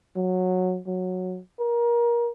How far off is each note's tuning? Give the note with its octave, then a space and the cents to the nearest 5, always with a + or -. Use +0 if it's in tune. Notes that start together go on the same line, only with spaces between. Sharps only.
F#3 -15
F#3 -10
A#4 +25